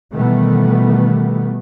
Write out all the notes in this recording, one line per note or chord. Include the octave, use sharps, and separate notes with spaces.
B2 D#3 E3 G3 A3 B3